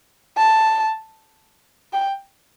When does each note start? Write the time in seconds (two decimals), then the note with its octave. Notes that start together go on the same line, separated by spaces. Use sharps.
0.37 A5
1.93 G5